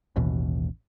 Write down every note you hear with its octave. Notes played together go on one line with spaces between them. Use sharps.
A1 D#2 B2 E3